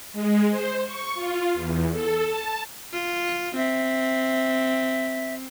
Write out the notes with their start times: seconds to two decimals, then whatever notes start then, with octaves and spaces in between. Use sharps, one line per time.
0.13 G#3
0.51 C5
0.85 C#6
1.15 F4
1.54 E2
1.91 A4
2.22 A5
2.93 F4
3.56 C4 E5